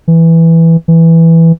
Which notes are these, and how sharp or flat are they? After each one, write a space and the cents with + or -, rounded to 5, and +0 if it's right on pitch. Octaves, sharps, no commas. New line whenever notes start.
E3 +0
E3 +0